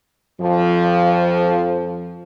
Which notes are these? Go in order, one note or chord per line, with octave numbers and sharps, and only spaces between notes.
F2 F3